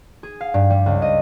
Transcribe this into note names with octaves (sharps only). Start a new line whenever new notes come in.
G#4
F5
G2
G3
C#2
D#5